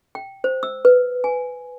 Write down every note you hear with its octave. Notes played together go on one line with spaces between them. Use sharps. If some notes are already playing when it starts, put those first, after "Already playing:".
G5
C5
E6
B4
G#5